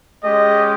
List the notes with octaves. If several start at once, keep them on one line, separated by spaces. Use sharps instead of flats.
G#3 C#4 G4 D#5